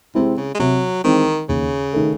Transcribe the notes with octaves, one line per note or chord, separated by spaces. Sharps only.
C3 G#3 C4 E4
C#3
G#3
C3 F#3
D#3 E3 G#3 C4 D#4
D#2 C#3
D#3 A3